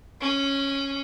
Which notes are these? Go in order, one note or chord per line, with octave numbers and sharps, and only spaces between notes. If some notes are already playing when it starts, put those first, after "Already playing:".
C#4